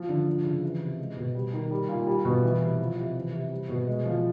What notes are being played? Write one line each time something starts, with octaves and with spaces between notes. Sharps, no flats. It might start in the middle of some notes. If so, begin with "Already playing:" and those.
Already playing: F3
D3
F3
C#3
E3
C3
G#3
B2
G3
D#3
G3
A#2
G3
B2
E3
C3
F3
C3
E3
C3
G3
B2
G#3
F3